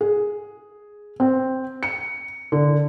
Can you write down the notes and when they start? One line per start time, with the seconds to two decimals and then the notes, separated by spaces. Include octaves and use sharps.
0.01 G#4
1.20 C4
1.83 C#7
2.52 D3